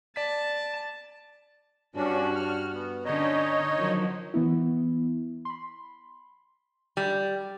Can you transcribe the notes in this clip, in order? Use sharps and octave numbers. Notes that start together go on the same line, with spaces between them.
D5 A5 B6
G2 C#4 D4 F#4
F6
B3
D3 C#4 D#4 C#5 D#5
D#3 F3 F#3
E3 B3 E4
B5 C6
G3